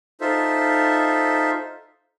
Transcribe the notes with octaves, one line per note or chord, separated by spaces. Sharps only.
D#4 F4 A4 C5 E5